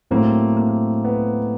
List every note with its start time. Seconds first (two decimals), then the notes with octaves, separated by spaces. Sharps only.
0.11 A2 F#3 A3 A#3 C4
0.57 A#3
1.05 B3